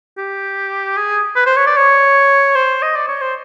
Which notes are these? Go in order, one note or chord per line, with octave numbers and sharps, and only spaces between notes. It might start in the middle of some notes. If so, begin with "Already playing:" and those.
G4
G#4
B4
C5
C#5
D5
C#5
C5
D#5
D5
C#5
C5